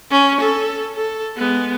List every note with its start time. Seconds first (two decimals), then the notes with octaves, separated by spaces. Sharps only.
0.11 C#4
0.41 A4
0.96 A4
1.37 G#3 B3